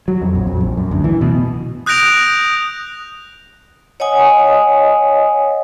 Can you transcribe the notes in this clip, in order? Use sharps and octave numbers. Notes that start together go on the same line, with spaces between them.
F#3
F2
A#1
F2
A#1
F#2
D2
E3
B2
D#6 F#6 G6 A#6 D7 F7
C#5 D#5 F#5 G#5 D#6